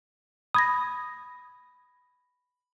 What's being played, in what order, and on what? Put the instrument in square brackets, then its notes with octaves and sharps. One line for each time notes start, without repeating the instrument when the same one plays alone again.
[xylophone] B5 A#6 [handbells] D#6 G#6